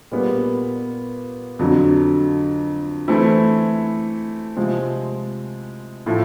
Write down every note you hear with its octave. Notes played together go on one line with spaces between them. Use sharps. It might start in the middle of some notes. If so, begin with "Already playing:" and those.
A#2 G3 B3
F2 D3 F#3
E3 A3 C4 E4
C3 F3 G#3 C4
A2 F3 A3